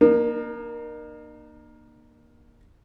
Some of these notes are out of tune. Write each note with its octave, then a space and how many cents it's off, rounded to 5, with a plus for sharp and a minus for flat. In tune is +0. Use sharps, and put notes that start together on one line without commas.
A#3 +15 D#4 -45